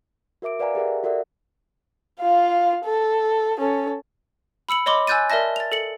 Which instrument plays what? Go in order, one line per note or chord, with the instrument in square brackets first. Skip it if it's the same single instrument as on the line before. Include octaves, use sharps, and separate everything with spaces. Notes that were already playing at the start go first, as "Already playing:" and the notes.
[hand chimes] F#4 A#4 E5 D6 D7
B4 D5 F5 F#5 G#5 A#5
G4 G#4 A#4 E5 F#5
F#4 A4 A#4 D5 E5 F#5
[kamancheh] F4 F5
A4
C#4 A4
[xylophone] B5 E6 C#7 F#7
C#5 D#5 B5 C6 D6
G#5 E6 F#6 G6 A6 D#7
A#4 D5 E5 A5 A#6
A6 F7
A4 C#7 F#7